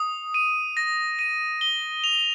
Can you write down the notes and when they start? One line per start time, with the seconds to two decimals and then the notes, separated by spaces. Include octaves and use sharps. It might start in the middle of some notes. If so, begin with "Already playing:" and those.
Already playing: D#6
0.34 D#7
0.77 A#6
1.19 D#7
1.61 G7
2.04 F7